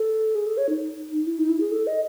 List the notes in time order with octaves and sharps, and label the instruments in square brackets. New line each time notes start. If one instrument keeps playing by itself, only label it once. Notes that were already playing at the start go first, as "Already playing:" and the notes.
Already playing: [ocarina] A4
G#4
A4
C#5
D#4
E4
D#4
E4
G#4
A4
D#5